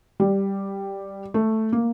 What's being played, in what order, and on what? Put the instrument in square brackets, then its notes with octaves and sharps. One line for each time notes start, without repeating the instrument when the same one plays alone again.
[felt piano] G3
A3
A#3